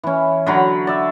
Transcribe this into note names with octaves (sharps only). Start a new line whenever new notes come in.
E3 C#4
D3 F#3 A#5 B5
D5 E5